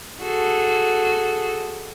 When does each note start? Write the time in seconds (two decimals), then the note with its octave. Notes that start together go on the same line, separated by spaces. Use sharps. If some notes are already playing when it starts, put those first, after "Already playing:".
0.23 F#4 G#4 A4